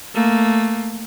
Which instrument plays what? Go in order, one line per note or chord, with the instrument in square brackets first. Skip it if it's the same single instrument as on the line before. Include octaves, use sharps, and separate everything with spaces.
[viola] A3 A#3